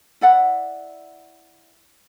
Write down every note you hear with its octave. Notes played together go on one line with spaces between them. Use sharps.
E4 D5 F#5